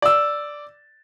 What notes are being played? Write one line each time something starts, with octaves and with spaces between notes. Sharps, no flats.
D5 E6